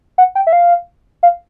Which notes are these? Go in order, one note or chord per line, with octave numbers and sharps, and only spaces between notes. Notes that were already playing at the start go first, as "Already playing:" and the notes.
F#5
G5
E5
F5
F5